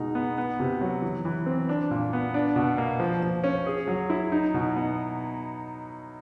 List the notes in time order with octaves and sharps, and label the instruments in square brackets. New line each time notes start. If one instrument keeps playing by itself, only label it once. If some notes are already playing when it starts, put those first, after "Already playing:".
Already playing: [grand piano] B2 G#3 D#4
B3
B3
C3
F#3
E3
E3
C4
D4
A#2
B3
D4
B2
A#3
F3
F3
C#4
G#4
F#3
E4
D#4
B2
B3